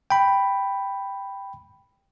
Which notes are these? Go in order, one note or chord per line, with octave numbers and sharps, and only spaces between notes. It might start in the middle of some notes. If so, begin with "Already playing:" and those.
G5 B5